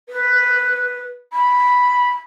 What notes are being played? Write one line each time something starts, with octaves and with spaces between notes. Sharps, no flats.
B4
B5